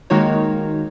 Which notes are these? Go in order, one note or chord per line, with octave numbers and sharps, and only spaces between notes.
D#3 G#3 A#3 D#4 F#4 C#5